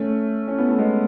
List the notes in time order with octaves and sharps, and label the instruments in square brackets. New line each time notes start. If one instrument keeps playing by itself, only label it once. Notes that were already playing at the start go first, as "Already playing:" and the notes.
Already playing: [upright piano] A3 C#4
C#4
B3
A3
G#3 B3